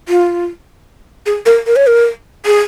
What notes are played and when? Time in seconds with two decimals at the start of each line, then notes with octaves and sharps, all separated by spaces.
0.09 F4
1.26 G#4
1.46 A#4
1.67 A#4
1.76 C#5
1.87 A#4
2.45 G#4